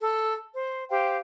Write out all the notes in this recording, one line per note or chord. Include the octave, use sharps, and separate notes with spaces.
A4
C5
G4 C5 F5 G5